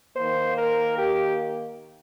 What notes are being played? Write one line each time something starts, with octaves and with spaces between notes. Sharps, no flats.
D#3 A#3 C5
A#4
G4